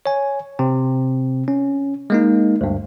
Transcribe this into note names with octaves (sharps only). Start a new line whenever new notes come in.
C#5 G#5
C3 C4
C#4
G#3 A#3 D#4
D2 G2